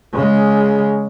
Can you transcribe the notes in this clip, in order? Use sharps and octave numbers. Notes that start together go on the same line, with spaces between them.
C#3 G#3